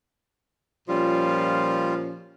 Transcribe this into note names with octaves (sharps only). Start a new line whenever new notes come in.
A#2 F3 G3 C#4 F4